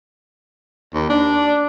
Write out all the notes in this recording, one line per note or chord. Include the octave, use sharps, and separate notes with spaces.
D#2
D4